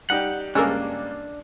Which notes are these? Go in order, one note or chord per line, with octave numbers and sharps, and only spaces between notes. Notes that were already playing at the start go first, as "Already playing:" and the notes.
G3 D#4 G4 F#5
C#2 G2 G#3 A#3 C#4 D4 A4 A#4